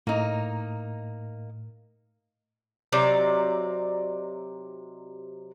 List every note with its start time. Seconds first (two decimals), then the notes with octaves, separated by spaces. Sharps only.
0.07 A2 A#3 D#4
2.92 C3 F#3 D#4 D5